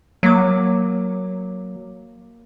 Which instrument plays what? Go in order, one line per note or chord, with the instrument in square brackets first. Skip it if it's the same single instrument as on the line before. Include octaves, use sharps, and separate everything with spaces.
[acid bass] F#3 [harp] A#3 D6